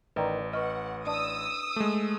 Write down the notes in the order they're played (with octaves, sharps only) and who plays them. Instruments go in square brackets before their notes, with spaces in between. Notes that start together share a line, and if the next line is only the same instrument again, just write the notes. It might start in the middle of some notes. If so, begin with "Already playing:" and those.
[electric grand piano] A1 [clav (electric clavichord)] D#3 [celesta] B4 D5
[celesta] B4 C#6 F6 [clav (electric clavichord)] D#5 [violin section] F#5
[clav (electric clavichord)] D4 [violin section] D#6 E6
[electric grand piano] G#3 A3